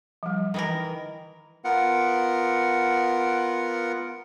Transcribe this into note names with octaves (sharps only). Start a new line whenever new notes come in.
F3 G3
D#3 E3 A#4
B3 F4 A#4 F#5